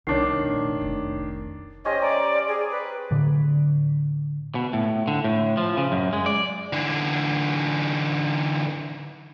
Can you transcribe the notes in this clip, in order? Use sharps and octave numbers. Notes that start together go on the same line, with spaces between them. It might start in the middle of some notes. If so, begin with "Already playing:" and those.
C2 D#3 D4 C#5 D6 C7
F1 A#1
F1 C2
C#4 G4 C5 D#5
D5 A#5
G#4
B4
A2 D3
B2
A2
D3
A2
F3
C#3
F#2
G#3
D5
D3 E3